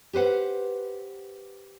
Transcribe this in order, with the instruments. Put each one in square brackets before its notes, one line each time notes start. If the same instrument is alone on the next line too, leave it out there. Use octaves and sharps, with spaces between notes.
[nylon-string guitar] G4 B4 C5 F#5